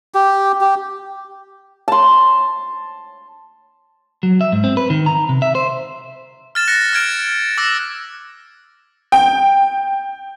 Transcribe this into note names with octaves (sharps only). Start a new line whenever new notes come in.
G4
G4
A5 C6
F#3
E5
G#2
C4
B4
D#3
A#5
C3
E5
C5
F6 A6 E7
F#6 A#6 C#7
F6 G#6 D7
D6 E6 F#6 A#6
G5